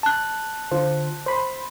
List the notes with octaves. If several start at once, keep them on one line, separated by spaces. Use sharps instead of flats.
A5 F#6
D3 F4 C5
C5 B5 C6